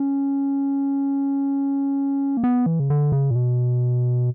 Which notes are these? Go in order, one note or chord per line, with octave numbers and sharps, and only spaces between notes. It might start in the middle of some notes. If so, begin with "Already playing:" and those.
Already playing: C#4
A#3
B3
E3
C#3
D3
C#3
A#2
B2